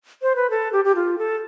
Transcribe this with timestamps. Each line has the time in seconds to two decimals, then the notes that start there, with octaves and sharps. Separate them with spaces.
0.22 C5
0.36 B4
0.50 A4
0.73 G4
0.85 G4
0.95 F4
1.18 A4